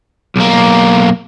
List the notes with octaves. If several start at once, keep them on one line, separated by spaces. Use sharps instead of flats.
B1 A#3